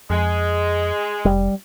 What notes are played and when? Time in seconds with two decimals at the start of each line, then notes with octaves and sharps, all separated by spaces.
0.10 F2 G#3
1.25 F1 G3